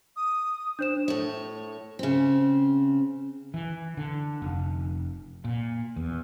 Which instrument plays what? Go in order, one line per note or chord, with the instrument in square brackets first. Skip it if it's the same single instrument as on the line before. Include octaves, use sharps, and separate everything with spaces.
[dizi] D#6
[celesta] D4 C5 E7
[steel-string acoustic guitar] A2 C#5
C#3 C4
[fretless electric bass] E3
D3
F1
A#2
E2